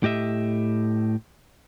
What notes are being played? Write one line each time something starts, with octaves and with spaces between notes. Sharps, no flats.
A2 G4 D#5 E5